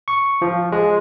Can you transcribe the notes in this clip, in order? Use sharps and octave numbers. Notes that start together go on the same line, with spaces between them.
C#6
F3
G#3